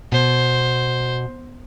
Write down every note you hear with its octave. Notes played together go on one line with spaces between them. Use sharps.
B2 C5